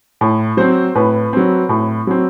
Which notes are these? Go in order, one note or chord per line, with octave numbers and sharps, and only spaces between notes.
A2
F#3 C4 C5
A2 B4
F#3 C4
A2
F#3 C4